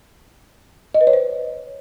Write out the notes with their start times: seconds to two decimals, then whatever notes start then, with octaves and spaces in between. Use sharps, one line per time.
0.95 D#5
1.01 B4
1.07 C#5
1.13 C5